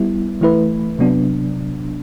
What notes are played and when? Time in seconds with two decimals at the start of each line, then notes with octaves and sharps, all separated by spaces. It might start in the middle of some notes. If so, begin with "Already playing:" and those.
Already playing: G3 B3 E4
0.41 E3 A3 E4 B4
0.99 C3 F#3 B3 D4